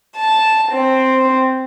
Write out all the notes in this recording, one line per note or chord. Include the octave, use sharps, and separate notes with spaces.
A5
C4